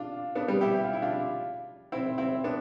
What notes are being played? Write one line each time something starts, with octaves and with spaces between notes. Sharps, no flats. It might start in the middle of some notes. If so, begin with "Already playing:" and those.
Already playing: D4 F4
B3 D4
G3 B3
E4 G4
G4
F4
E4
D4 F4
C4 E4
C4 E4
B3 D4